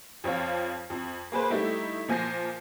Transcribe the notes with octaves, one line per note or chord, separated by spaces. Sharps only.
F2 F3 C#5 F5
F2
A#3 G#4 B4 C5
G3 A3 D#4 E4 G4
A#2 F3 G#5 G6 A#6 C7